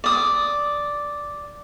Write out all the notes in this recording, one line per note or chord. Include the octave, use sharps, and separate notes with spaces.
D5 D#6